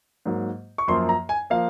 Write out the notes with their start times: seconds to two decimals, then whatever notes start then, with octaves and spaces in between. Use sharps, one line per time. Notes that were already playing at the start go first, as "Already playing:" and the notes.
0.26 G#2 F#3 A#3
0.78 C#6
0.88 F#2 F3 A#3 C6
1.09 A#5
1.29 G#5
1.50 F3 A#3 F5